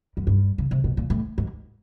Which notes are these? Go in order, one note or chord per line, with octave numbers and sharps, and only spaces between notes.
F#2
G2
C#3
C3
B2
A#2
A2
G#2